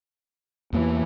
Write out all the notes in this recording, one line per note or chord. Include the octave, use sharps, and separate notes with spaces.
E2 E3 A#3